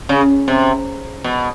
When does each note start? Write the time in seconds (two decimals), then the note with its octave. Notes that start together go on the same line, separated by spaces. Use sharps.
0.09 C#3
0.48 C3
1.24 B2